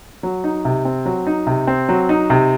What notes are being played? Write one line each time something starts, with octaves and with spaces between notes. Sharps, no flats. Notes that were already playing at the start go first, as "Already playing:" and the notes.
F#3
D#4
C3
C4
F#3
D#4
C3
C4
F#3
D#4
C3